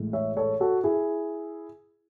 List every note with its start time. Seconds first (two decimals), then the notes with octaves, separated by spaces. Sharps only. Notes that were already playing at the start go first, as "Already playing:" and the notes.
Already playing: A1 A2 G#3
0.13 C#5 E5
0.37 A4 C#5
0.60 F#4 A4
0.84 E4 G#4